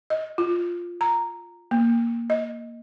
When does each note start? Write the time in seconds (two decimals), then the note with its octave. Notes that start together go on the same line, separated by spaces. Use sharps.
0.10 D#5
0.38 F4
1.01 A#5
1.71 A#3
2.30 D#5